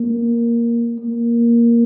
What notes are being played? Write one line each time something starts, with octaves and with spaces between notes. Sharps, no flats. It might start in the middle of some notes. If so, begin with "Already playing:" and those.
Already playing: A#3
A#3